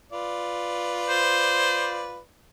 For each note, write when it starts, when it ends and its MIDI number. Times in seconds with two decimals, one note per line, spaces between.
0.12 2.21 65
0.12 2.21 71
0.12 2.21 74
1.09 2.06 72